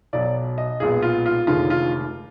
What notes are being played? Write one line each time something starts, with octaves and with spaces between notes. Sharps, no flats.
B1 B2 F#3 D5
D#5
B1 A#2 G#3 B3 G#4
F4
F4
F1 D#2 D3 G#3 F4
F4